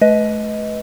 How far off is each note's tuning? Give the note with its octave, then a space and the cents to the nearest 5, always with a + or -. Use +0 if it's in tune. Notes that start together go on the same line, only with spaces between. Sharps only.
A3 -30 B4 +0 D#5 +15